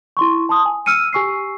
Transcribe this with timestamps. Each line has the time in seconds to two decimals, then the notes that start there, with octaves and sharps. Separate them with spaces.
0.17 E4 C6 C#6
0.49 A5 C6 D#6
0.65 G#5
0.86 E6 F6 C#7 D#7
1.13 G4 G#5 C#6 E6 C7